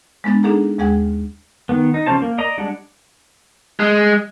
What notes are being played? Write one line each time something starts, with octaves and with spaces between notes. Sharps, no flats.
G#3 B3 D4 A6
D4 D#4 G#4 A4 F#5 A#5
D#2 G#3 G#4 F#5 G5 G#6
D#3 B3
D#4
C#3 F3 C#4 C5 A5
A#3
D5 D#5 A#5
G3 G#3 D4 D5 F#5
G#3